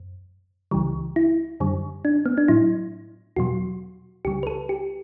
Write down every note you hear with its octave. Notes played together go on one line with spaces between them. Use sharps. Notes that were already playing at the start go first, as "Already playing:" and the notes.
Already playing: F#2
C#2 C#3 E3 G3
E4
F#2 D3 G3
D4
B3
D4
A2 F#3 E4
E2 B2 F#3 F#4
C#2 C#3 G3 G4
B4
A4
G4